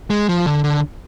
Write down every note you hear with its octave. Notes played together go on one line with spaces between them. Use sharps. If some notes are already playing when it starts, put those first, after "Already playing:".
G#3
F3
D3
D3